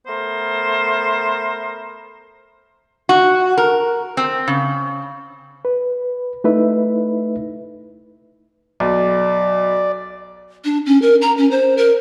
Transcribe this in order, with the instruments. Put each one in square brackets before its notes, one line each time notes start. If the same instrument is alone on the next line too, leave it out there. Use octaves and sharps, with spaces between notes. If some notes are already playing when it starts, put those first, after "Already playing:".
[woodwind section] A3 B3 A#4 C5
[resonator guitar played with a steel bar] F#4
A#4
C4
C#3
[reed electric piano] B4
A3 D#4 E4 B4 E5
[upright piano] B1 [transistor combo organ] D5
[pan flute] D4
C#4
A#4
A#5
C#4
C5
A#4